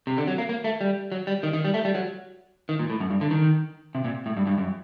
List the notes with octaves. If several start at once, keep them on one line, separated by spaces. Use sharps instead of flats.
C3
D3
F#3
A#3
A#3
A3
G3
F#3
G3
D#3
D#3
G3
A3
G3
F#3
D#3
A#2
A2
F#2
G2
D3
D#3
C3
A#2
A2
G2
G2
F#2